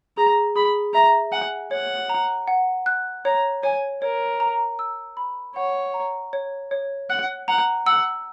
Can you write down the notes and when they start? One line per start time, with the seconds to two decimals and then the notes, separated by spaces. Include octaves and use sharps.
0.17 G#4 A#5
0.56 G#4 B5
0.94 E5 A#5
1.32 F#5 G#5
1.71 C#5 F#5
2.09 A#5
2.48 F#5
2.86 F#6
3.25 C#5 A#5
3.63 C#5 G#5
4.02 A#4 C#5
4.40 A#5
4.79 E6
5.17 B5
5.56 C#5 F#5
5.94 A#5
6.33 C#5
6.71 C#5
7.10 F#5 F#6
7.48 F#5 A#5
7.87 F#5 E6